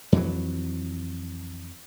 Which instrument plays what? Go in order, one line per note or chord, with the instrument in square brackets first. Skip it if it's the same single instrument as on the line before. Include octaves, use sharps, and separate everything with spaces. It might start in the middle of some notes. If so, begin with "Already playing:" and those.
[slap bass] F2 E3 F#3